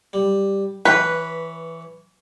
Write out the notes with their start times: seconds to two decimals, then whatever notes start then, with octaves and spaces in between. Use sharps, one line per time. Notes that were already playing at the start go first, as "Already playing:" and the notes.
0.13 G3
0.85 E3 B4 C#5